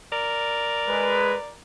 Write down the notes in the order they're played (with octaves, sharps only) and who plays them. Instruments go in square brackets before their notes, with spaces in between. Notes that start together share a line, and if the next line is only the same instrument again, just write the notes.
[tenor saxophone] A#4 [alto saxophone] D5
[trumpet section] G#3 B4